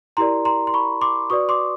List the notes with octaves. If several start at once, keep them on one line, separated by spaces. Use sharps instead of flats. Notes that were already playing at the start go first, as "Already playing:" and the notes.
E4 G4 A#4 D5 A#5 C6
A#5 C6
C6
B5 C#6
C6 D6
F#4 B4 D5 C#6 D#6
C6 D6